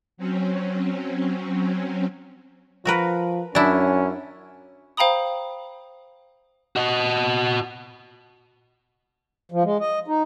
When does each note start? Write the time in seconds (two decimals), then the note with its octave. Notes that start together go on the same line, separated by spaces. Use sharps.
0.17 F#3 C4 C#4
2.85 F3 F#4 A#4 B4
3.55 F#2 C#4 D4 E4
4.97 C5 F5 G5 A#5 B5 D#6
6.76 F#4 D#5
9.52 F3
9.64 G#3
9.80 D#5
10.08 D#4